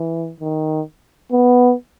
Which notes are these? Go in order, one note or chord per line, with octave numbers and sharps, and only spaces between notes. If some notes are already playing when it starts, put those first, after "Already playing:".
Already playing: E3
D#3
B3